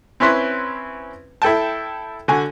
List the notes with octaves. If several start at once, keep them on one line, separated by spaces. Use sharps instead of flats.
C4 C#4 E4 B4 C6
E4 A4 G5 A5
D3 F#4 G#5